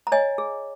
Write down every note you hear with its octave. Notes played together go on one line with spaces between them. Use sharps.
A#5
C#5 D#5 G#5
G#4